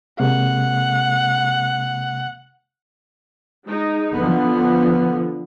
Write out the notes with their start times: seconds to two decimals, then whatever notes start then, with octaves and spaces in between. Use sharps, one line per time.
0.20 C3 G#3 A#3 F#5
3.67 G#3 D#4
4.15 D3 F3 B3